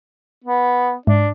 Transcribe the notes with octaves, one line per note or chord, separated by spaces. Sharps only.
B3
G#2 D4